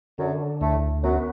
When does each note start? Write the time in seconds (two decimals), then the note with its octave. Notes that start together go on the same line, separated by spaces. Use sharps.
0.18 F#2 D3 F#3
0.60 D2 A2 A3
1.03 F#2 F#3 B3